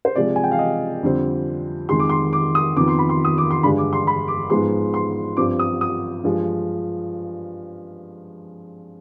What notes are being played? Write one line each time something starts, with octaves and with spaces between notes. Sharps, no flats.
C5
C3 F3 G#3 D5
G#5
G5
F5
D#5
F2 D3 G3 C4
F2 D#3 G#3 C6
D6
C6
D6
D#6
F2 D#3 B3 D6
C6
B5
C6
D#6
D6
C6
G2 D3 G#3 B5
D6
C6
B5
D6
G#2 F3 G#3 B3 C6
C6
G2 F3 C4 D6
D#6
D#6
G2 F3 G#3